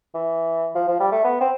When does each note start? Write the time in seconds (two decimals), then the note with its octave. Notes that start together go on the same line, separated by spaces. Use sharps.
0.14 E3
0.75 F3
0.88 F3
1.00 G3
1.12 A3
1.24 B3
1.41 C4